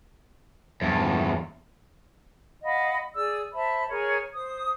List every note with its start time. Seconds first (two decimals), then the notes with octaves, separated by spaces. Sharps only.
0.81 E2 G2
2.65 D#5 F5 F#5 B5
3.15 G#4 D5 E6
3.54 C5 E5 A5 B5
3.89 G#4 A#4 C#5
4.34 C5 D#6